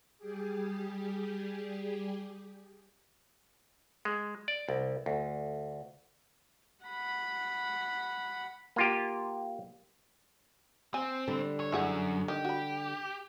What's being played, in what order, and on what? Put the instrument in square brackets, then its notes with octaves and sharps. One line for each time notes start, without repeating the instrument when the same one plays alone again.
[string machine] G3 G4 G#4
[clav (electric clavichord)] G#3
D5
C2
D2
[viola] F#5 B5
[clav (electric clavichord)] A#3 F4 G4
[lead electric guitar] C4 [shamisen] G#5
[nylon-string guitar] D3 G3
[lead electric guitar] C#5
[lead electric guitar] F#2 [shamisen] E4 G#4 F#5
[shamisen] D#3 D#5 [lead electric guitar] G4
[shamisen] F#4 B5